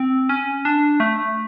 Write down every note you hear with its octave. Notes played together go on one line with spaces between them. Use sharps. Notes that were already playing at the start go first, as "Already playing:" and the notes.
Already playing: C4
C#4
D4
A3